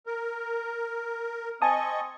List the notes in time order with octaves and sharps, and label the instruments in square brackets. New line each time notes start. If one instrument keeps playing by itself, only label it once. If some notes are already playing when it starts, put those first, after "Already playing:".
[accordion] A#4
[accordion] C4 D#5 C#6 [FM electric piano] G#5 A5 D#6